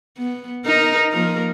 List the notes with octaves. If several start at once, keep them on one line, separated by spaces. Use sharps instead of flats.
B3
D#4 A#4
F3 A#3 A#4